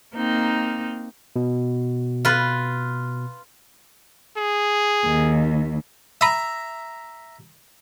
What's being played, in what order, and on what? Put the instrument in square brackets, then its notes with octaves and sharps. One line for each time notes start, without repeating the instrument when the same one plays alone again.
[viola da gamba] A#3 C4 D#4
[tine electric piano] B2
[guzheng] F4 B4
[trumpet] G#4
[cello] D#2
[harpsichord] E5 A#5 [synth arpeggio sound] B5 D#6